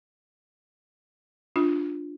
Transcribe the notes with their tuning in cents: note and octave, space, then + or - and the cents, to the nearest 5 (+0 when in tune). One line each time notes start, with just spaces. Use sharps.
D4 +0 F4 +10